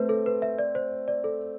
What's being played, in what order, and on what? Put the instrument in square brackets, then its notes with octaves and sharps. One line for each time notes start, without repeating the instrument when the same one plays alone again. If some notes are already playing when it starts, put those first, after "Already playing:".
Already playing: [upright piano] A3 C4 [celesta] B4
[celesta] A4
B4
E5
D5
C5
D5
A4